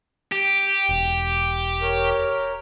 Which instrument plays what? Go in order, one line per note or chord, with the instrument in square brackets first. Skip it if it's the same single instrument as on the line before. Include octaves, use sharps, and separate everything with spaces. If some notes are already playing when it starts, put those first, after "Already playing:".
[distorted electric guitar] G4
[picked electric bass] E1
[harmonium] A#4 C#5